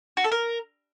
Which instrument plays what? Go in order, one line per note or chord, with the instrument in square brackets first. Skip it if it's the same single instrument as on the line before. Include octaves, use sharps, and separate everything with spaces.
[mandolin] F#4
A4
A#4